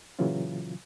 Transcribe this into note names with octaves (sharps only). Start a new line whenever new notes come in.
A#2 C#3 E3 F#3 F4